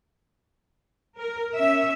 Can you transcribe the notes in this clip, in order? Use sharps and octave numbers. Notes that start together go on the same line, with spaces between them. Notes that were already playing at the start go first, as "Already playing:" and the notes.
A#4
C#4 E5